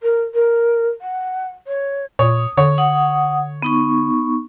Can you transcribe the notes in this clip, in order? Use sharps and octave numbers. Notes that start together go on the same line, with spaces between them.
A#4
A#4
F#5
C#5
A#2 C#5 D#6
D3 C#5
F#5 D#6
B3 D#4 C#6